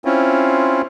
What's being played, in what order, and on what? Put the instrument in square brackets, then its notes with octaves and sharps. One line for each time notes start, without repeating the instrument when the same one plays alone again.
[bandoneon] C4 C#4 E4 F4